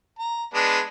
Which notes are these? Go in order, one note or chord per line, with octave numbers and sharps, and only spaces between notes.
A#5
G#3 B3 D4